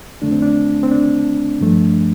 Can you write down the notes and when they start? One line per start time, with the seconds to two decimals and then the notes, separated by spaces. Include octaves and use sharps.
0.22 F2 D3 A3 D4
0.32 C4
0.42 D4
0.83 C4
0.91 D4
1.61 G2 F3 A3